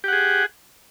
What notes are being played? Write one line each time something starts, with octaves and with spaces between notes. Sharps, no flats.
G4 G#4 F#5